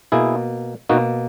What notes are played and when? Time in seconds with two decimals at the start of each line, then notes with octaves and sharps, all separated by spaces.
0.12 B2 A#3 E4 G#4
0.89 B2 A#3 D#4 F#4